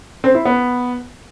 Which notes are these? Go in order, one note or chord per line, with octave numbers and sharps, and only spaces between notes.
C4
E4
B3